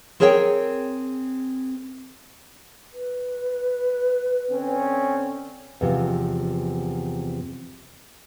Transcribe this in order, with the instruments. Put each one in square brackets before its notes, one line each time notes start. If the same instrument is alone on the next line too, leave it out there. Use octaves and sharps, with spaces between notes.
[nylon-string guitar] C4 G#4 A#4 C#5 F#5 G5
[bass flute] B4
[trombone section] D3 C4 C#4
[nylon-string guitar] E2 C3 F3